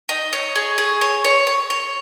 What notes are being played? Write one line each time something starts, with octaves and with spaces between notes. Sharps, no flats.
D#4
C#5
G#4
G#4
C#5
C#5
C#5
C#5